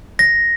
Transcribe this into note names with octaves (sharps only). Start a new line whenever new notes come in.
A#6